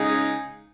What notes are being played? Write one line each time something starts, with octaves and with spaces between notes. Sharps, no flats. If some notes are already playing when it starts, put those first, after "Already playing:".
Already playing: C#3 G#3 D#4